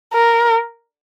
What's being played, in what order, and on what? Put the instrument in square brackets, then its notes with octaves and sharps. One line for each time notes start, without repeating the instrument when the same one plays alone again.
[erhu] A#4